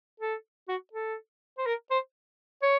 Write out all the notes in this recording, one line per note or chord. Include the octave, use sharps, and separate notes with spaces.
A4
F#4
A4
C5
A#4
C5
C#5